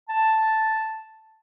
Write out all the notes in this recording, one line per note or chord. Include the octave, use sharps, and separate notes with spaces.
A5